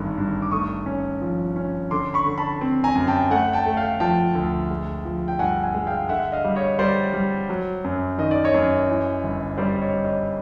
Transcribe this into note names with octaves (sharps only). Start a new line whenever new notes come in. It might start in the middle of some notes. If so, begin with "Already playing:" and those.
Already playing: G#1 G2 D3
G2
D6
A3 C#6 D#6
C#4
F3
C#4
D3 C6 D6
B5 C#6
D3
A5 B5
C4
G#5 A#5
F#2
G5 A5
A3 F#5 G#5
G5 A5
A3
F5 G5
F3 G5 A5
D2
G#3
F3
G5
G2 F#5 G#5
F#5 G#5
G#3
F5 G5
D3 E5 F#5
D#5 F5
G3
C#5 D#5
G3 C5 D5
G3
F#3
F#2
D#3 D#5
D5
C#5 D#5
F#2
E3
G1
G3 C5 D5
C#5 D#5
G3
C#5 D#5